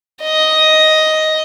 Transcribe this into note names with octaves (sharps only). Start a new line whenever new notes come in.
D#5